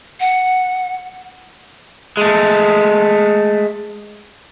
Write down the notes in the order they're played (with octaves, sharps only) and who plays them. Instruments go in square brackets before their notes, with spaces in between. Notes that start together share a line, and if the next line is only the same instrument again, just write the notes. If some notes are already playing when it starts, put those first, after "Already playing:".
[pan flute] F#5
[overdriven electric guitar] G#3 A3